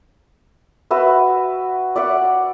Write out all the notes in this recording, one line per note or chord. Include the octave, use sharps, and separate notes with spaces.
F#4 B4 E5
D5 E5 F#5